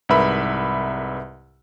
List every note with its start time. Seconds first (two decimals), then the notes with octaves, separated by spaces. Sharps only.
0.09 C2 G#2 A#4 B4 E5 B5